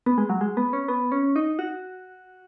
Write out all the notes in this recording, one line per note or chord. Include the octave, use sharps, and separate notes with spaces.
B3
G#3
F#3
G#3
B3
C#4
B3
C#4
D#4
F#4